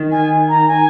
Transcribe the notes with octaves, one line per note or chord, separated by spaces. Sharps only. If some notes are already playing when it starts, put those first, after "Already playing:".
Already playing: D#3
G#5
A#5
G#5